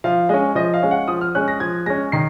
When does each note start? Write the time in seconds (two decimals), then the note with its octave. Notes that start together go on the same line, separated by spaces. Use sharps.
0.04 F3 F5
0.29 G#3 C#4 D#5
0.55 F3 D#5
0.74 F5
0.83 G#3 C#4
0.91 F#5
1.08 F3 D#6
1.21 F6
1.35 G#3 C#4 F#6
1.48 A#6
1.60 F3 G#6
1.86 G#3 C#4 A#6
2.12 D#3 C7